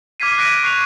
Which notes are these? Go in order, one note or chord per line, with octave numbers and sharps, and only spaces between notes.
D6 F6 G#6 B6 C7 D#7
F#6 A#6 B6 D7 D#7
C#6 F#6 C7 F7